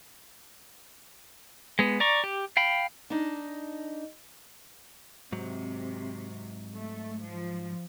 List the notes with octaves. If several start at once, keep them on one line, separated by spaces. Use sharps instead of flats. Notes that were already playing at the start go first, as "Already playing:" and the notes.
G#3 B3
D5 A#5 C#6
G4
F5 G5 B5
D4 D#4
G#2 C3 F#3
A3
F3